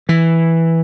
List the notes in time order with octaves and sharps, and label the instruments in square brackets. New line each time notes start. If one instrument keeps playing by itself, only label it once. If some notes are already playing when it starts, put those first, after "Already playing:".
[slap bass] E3